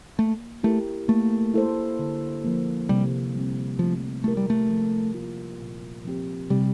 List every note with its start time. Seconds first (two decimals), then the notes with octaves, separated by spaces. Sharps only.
0.18 A3 A#3
0.63 A3 E4 G4 A#4
1.08 A3 A#3
1.54 E4 A4 C5
1.99 D3
2.44 F3 A#3
2.89 C3 G3
3.35 G3 C4
3.79 F3 A3
4.24 A3 E4 G4 A#4
4.37 G3
4.50 A3
4.69 F3
5.14 A#3 F4
5.60 A#2
6.05 F3 C4 G4
6.50 C3 G3